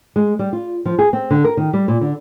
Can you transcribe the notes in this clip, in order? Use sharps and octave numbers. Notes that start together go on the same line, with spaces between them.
G#3
G3
F4
F3
G#4
C4
D3
A#4
D#3
G3
A#2
D3